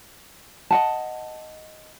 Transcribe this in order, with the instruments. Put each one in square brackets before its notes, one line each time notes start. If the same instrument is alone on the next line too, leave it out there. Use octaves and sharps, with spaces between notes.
[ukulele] D#5 F#5 A5